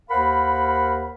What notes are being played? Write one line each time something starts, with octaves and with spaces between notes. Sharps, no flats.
D#2 A#4 C5 F5 F#5 B5